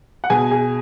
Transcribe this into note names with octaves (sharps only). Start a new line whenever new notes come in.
F#5
B2 G#4 G#5
G#4 G#5